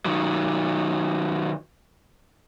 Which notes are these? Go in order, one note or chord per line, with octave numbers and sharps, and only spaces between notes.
D#3 F#3